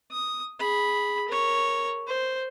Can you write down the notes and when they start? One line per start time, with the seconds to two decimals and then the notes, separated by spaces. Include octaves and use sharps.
0.11 D#6
0.59 G#4 B5
1.28 A#4 C#5
2.07 C5